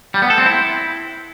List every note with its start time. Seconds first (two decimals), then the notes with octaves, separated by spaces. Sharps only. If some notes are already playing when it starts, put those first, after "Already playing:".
0.14 G3
0.22 B3
0.30 A4
0.38 C4
0.46 E4